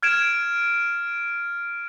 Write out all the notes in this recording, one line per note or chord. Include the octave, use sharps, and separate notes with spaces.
F6 G#6 D7 E7